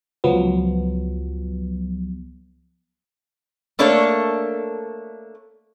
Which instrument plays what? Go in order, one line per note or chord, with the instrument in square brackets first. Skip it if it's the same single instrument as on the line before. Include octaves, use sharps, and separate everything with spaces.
[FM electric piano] C#2 F3 F#3 B3
[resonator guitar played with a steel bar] A3 A#3 D4 A4 C#5